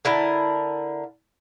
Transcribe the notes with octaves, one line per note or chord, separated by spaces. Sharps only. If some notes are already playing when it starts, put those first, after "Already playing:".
D3 E4 A#4 A5